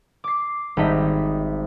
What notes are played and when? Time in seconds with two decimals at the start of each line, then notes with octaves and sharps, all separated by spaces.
0.24 D6 C7
0.77 G#1 G3 D#4 E5